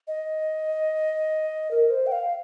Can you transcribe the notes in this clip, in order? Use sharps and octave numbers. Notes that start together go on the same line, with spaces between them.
D#5
A#4
C5
G5
F5